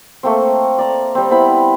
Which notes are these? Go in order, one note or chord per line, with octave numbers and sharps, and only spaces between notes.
A3 A#3 C4
D5 A#5
G3 C4
B3 C4 E4 B5